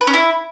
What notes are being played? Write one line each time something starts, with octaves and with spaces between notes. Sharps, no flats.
B4
C#4
E4